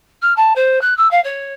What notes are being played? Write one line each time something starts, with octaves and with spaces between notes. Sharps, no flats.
F6
A5
C5
F#6
E6
F5
C#5